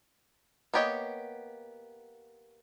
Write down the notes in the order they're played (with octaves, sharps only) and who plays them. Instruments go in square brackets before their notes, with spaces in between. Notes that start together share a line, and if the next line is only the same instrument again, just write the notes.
[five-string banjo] A#3 B3 G4 C#5 D#5